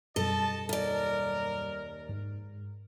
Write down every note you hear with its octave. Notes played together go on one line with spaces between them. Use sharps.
F#2 B2 G3 A4 D#5 A5
D#2 A#4 D5
G#2